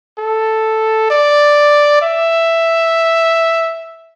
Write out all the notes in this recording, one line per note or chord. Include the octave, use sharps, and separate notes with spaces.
A4
D5
E5